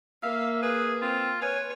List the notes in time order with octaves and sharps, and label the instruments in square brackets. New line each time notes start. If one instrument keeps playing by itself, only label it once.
[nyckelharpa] A#3 [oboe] E5 [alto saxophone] F5
[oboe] G#4 [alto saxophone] B4
[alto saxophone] C4 [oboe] F4
[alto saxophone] B4 [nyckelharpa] C#5 [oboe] G#5